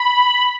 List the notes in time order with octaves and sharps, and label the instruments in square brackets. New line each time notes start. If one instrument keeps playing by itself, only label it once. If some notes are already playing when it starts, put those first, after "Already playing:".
Already playing: [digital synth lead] B5